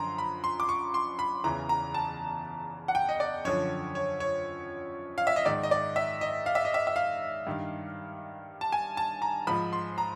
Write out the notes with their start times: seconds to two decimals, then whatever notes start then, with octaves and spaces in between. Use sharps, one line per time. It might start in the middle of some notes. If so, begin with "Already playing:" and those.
Already playing: F#2 D3 F3 A#5 C6
0.18 B5
0.44 C6
0.60 D6
0.69 C#6
0.94 C6
1.19 B5
1.44 E2 C#3 E3 A#5
1.69 A#5
1.94 A5
2.88 F#5
2.95 G5
3.09 D#5
3.20 D5
3.45 F#2 D3 F3 C#5
3.95 C#5
4.20 C#5
5.18 F5
5.27 E5
5.36 D#5
5.45 G#2 D#3 D5
5.63 D#5
5.71 D5
5.96 E5
6.21 D#5
6.46 F5
6.55 E5
6.65 D#5
6.74 E5
6.87 E5
6.96 F5
7.47 G2 D#3
8.61 A5
8.72 G#5
8.97 A5
9.22 A#5
9.47 G#2 F3 B5
9.73 C6
9.98 A#5